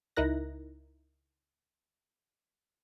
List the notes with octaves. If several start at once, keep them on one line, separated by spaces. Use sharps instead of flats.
C#2 D#4 E4 A#4 F#6 A#6